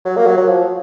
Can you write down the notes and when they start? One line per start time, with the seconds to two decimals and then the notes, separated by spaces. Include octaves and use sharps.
0.05 F#3
0.17 A#3
0.26 F#3
0.38 F#3
0.49 F3